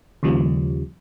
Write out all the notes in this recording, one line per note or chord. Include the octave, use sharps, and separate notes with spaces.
D#2 C#3 F3 G3